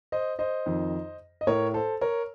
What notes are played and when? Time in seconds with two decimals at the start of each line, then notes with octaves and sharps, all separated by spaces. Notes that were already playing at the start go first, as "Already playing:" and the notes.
0.12 C5 D#5
0.39 C5 D#5
0.66 F2 D#3
1.41 D#5
1.47 A2 A#4 C#5
1.74 A4 C5
2.01 A#4 C#5